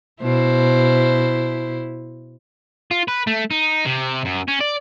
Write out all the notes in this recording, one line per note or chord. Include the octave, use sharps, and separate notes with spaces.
B2 E4 C5
F4
B4
A3
D#4
C3
F#2
C#4
D5